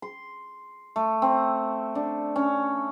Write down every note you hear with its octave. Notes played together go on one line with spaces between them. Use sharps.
C6
A3
C4
D4
C#4